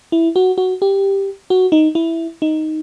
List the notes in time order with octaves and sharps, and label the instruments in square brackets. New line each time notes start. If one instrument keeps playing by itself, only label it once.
[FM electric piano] E4
F#4
F#4
G4
F#4
D#4
E4
D#4